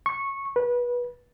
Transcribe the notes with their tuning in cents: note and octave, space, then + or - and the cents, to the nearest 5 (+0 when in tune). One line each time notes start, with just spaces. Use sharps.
C#6 -15
B4 -25